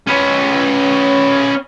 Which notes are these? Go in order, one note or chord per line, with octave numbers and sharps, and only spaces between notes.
C#4 B4